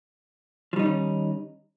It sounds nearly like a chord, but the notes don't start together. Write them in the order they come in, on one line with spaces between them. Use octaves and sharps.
F3 G3 D#4 D#3 C#4